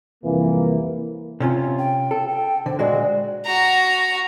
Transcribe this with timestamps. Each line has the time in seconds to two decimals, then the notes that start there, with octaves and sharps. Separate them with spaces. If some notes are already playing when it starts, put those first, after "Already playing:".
0.24 C2 F2 E3 A#3
1.40 C3 C#4 F4
1.78 G5
2.11 A4
2.28 G5
2.66 D3 C5
2.79 A#2 G#3 F#4 D5
3.45 F#4 A#5